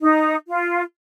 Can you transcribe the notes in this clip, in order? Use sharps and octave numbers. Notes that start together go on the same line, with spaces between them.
D#4
F4